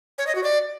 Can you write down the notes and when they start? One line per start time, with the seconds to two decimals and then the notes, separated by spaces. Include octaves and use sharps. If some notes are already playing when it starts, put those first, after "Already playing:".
0.18 C#5
0.27 D#5
0.35 F#4
0.44 D5